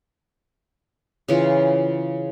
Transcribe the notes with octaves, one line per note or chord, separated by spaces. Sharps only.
C#3 E3 F4